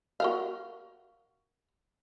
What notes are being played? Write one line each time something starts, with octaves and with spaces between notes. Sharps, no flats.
F#4 A#4 F5